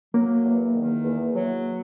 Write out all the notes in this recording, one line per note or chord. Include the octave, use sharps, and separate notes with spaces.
F#3 A#3
E2
D#3
E2
F#3